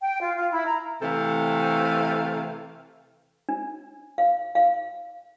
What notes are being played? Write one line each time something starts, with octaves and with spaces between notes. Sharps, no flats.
G5
F4
F4
E4
A#5
C3 E3 A3 A4 F5
D4
F5
F5